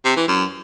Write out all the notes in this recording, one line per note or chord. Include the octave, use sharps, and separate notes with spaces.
C3
E3
F#2